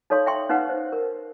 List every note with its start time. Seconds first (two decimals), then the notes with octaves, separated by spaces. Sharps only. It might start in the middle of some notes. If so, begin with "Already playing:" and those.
0.10 D#4 A4 C#5 F5 C6
0.26 E5 G5 C6
0.49 C#4 D#4 B4 F5 F#5
0.69 C5
0.92 A#4